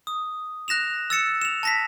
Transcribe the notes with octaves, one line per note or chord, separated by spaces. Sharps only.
D#6
F#6 A#6 E7 F7
E6 A6 C#7 E7
E7 F7
A5 A#6 B6